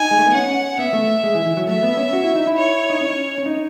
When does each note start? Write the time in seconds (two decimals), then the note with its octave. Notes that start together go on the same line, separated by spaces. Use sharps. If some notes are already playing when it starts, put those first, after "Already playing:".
Already playing: D#4 G#5
0.11 G#3
0.19 A3
0.27 B3
0.34 C#4 F#5
0.79 B3 E5
0.93 A3
1.24 G#3
1.35 E3
1.46 E3
1.57 F#3
1.67 A3 E5
1.83 B3
1.97 C#4
2.13 F#4
2.24 E4
2.35 D#4
2.47 E4
2.57 C#5
2.90 D#4
3.01 C#4
3.38 C#4
3.46 D#4